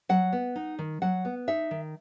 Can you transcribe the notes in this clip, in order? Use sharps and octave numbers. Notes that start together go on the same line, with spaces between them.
F#3 F#5
B3
D#4
D#3
F#3 F#5
B3
D#4 E5
D#3